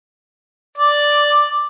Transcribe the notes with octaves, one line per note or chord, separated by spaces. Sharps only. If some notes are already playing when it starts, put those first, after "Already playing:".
D5